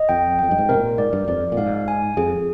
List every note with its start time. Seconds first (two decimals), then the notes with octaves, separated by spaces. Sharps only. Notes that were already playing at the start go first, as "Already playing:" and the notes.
Already playing: D#5
0.09 F2 G5
0.39 F2 G5
0.51 G2
0.59 G#2
0.69 C3 A#4
0.78 A#2
0.98 G#2 D5
1.13 G2
1.28 F2 D5
1.52 A#2
1.57 G#2 F5
1.88 G#5
2.17 F2 G#4